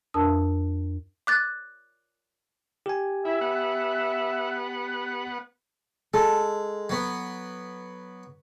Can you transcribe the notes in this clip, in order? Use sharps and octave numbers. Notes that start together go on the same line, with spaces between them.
F2 D4 A#4 A5 D#6 E6
D6 F#6 A6
G4 G#5
E4 E5
B3 F#5
G#3 A4
F#3 B3